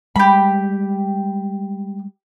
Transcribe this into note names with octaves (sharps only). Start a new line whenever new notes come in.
G3 G#3 G4 B5